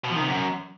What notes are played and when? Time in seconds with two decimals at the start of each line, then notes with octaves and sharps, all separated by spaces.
0.05 B2
0.10 F3
0.16 D#3
0.22 C3
0.28 F#2